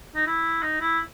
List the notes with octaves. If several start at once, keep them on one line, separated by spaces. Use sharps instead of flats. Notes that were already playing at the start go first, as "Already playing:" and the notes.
D#4
E4
D#4
E4